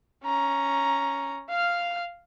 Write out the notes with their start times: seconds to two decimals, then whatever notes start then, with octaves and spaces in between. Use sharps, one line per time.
0.24 C#4 A#5
1.50 F5 F6